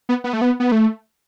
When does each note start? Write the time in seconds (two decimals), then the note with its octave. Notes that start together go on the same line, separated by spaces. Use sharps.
0.09 B3
0.24 B3
0.33 A3
0.41 B3
0.60 B3
0.72 A3